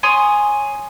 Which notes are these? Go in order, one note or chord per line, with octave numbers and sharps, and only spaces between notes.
C#5 G#5 C6 D#6